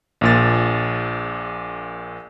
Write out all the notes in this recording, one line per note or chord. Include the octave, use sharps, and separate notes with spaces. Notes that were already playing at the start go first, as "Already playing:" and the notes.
A#1 A#2 A6